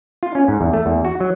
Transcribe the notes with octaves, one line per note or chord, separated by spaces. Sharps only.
F4
C#4
G#2
E2
A3
E2
F#4
F#3